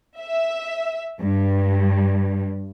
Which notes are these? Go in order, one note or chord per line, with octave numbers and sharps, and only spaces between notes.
E5
G2